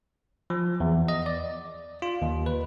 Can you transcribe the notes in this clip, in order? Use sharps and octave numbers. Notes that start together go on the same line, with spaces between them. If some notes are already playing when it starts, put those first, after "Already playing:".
F3
E2
D#5
D5
F4
D#2
B4